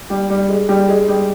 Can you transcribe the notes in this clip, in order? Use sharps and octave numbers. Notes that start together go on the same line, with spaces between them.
G3 G4
G3 G4
G#3 G#4
G3 G4
G#3 G#4
G3 G4